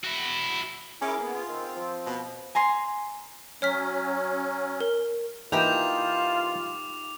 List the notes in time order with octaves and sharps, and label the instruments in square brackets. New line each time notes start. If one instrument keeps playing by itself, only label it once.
[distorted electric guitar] E4 F#4
[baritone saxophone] C#4 [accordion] E4 A#4 D6 [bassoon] G#4
[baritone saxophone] A#3 [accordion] B3
[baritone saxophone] F4
[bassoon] D#3 [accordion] C4
[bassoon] F3
[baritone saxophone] B2
[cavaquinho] G#5 A#5 C6
[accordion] F#3 C#4 [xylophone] C#5 F6 B6
[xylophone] A#4
[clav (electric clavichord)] E3 A#3 [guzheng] D#4 G4 [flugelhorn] F4 [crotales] D6 F7